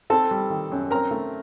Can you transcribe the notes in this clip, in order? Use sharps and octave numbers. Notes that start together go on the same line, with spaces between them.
C4 A4 A5
G3
D#3
F#2
C4 A#4 A#5
A3